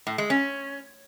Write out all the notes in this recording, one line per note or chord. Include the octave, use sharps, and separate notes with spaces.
A2
G#3
C#4